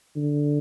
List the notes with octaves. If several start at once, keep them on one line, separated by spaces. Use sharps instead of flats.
D3